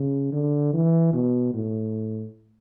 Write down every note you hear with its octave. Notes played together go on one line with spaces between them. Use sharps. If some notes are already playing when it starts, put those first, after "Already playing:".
Already playing: C#3
D3
E3
B2
A2